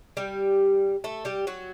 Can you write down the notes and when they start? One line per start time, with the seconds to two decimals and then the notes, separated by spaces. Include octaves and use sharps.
0.17 G3 G4
1.04 A3 A4
1.25 G3 G4
1.47 F#3 F#4